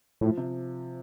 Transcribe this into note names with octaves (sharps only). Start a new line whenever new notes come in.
A2 F3
C3